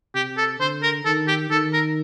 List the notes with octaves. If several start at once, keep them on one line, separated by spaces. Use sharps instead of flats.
C3 G4
A4
D3 C5
A#4
D#3 A4
G4
D#3 A4
A#4